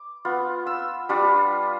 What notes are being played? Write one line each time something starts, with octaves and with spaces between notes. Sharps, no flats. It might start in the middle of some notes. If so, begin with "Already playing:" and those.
Already playing: D6
B3 F4
E6
G3 D4 F4